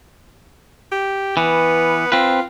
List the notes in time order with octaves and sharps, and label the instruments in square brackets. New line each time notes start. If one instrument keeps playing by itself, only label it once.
[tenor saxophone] G4
[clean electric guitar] E3 [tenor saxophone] B3
[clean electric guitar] C4 B4 [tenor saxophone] F4